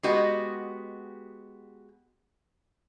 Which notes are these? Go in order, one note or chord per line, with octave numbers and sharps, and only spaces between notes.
G#3 B3 F#4 G4 D#5